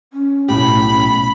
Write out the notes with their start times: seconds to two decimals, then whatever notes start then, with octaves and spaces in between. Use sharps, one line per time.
0.13 C#4
0.49 B1 A2 G4 B5